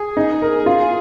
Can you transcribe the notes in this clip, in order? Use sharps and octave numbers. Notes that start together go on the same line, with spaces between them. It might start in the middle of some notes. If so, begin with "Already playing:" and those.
Already playing: G#4
D#4
A#4
F4